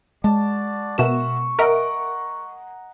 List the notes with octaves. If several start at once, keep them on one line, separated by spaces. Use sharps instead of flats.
G#3 F#4 D5 A5
B2 A#4 E5 F#5 C#6 E7
A#4 D#5 E5 F#5 A#5 D7